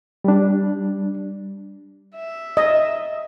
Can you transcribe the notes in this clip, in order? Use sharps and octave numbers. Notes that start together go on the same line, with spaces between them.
G3 D4
E5
D#5